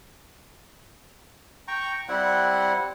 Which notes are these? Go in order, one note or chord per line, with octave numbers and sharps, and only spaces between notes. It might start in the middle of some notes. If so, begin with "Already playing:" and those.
G5 A#5 C#6
G3 C4 E4 F#5